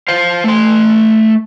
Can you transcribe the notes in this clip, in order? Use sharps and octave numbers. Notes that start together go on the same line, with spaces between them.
C5 F5
A3 C6